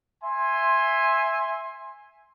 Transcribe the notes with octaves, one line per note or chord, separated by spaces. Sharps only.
E5 G#5 C6